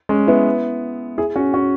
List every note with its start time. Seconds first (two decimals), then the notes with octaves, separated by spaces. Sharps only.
0.09 G#3 C#4
0.27 B3 E4
1.18 E4 G#4
1.36 C#4 F#4
1.54 C#4 F#4